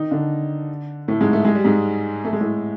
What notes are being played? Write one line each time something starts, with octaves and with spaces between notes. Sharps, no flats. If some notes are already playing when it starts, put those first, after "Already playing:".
Already playing: D#3 D#4
D3 D4
A2 A3
G#2 G#3
A3
G#3
G3
G#2 G#3
A3
G#3
A2 A3